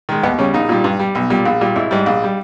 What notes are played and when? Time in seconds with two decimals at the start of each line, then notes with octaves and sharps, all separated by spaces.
0.09 D#3 G#3
0.23 D#2 B3
0.38 C#3 G3 C#4
0.54 A#1 D#4
0.69 A#2 G3
0.84 G2
0.99 G3
1.15 B1
1.30 A#2 G3
1.45 A#1
1.61 A#2 G3
1.75 G#1 E4
1.91 G#2 G3
2.06 A#1
2.24 G3